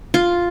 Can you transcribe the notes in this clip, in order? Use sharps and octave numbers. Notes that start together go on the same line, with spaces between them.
F4